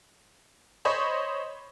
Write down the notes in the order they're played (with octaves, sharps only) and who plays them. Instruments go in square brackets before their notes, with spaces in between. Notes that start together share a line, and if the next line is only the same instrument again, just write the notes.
[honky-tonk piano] C5 C#5 D#5 B5 C#6